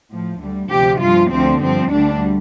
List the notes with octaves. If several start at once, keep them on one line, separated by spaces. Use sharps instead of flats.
A2 F3
D2 D3 G3
D2 C3 F3 G4
G2 F3 F4
D2 D3 F3 C4
G2 F3 C4
D2 D3 G3 D4